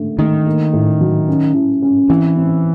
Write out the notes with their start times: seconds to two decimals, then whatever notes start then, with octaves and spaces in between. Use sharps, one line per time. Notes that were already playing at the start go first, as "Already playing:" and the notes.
Already playing: D3 A3
0.19 D#3 A3
0.46 A#3
0.73 A2
1.01 F#3
1.28 C#4
1.54 E4
1.82 C#4
2.09 E3 C4
2.36 C4